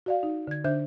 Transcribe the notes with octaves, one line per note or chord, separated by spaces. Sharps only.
F#4 D5 F5
D#4
D3 G#6
D3 D4 C5 E5 G6